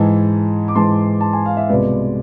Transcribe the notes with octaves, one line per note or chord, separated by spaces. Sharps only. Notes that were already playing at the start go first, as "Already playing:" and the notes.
Already playing: G#2 E3 G#3 A5
D6
G#2 E3 G#3 A5 C6
A5
G#5
F5
E5
C2 B2 G#3 B4 D5